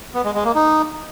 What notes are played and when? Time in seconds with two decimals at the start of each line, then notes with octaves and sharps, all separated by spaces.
0.14 B3
0.25 G#3
0.35 G#3
0.45 A#3
0.55 D#4